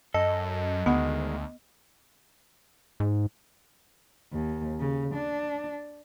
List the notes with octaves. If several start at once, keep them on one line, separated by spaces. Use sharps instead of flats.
F#2 A4 D#5
D2 D#3 G#3 B3 F#5
G#2
D#2
C#3
D4